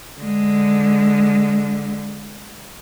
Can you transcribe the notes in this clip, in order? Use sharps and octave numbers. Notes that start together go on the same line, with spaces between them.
D3 G#3